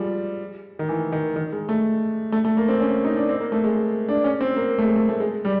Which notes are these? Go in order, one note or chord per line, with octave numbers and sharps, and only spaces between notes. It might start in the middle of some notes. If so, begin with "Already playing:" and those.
Already playing: F3 G3 G#3
D#3
E3
D#3
D#3
G#3
A3
A3
A3
A#3
C4
C#4
D#4
D4
C4
A#3
A3
G#3
D4
C#4
C4
A#3
A3
G#3
A3
A3
G#3
G3